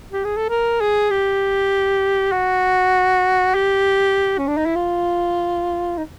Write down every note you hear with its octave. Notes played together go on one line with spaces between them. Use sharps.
G4
G#4
A4
A#4
G#4
G4
F#4
G4
C#4
D4
D#4
E4
F4
D#4